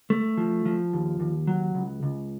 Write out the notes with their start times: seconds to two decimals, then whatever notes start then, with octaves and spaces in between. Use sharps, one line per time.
0.10 A3
0.37 F3
0.65 F3
0.93 D#2
1.20 D#2
1.47 F#3
1.75 C#2
2.03 C#2